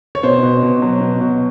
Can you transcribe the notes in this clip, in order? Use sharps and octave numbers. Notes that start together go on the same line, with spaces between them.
C#5
B2 C5
B2
B2
F#3
B2
B2